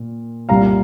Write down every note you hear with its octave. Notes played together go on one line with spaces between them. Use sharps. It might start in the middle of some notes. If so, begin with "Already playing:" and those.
Already playing: A#2
C2 A#2 G3 F5 A#5